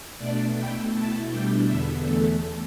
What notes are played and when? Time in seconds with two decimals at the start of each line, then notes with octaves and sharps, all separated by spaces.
0.19 B2 A3 D4 D5
0.56 B2 A3 E4 G5
0.92 B2 A3 E4 A5
1.30 B2 G3 D4 G5
1.66 E2 D3 B3 E5
2.04 E2 E3 A3 A4